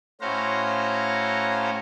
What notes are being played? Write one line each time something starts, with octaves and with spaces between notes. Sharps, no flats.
A2 C#4 F#4 C5 F5 A#5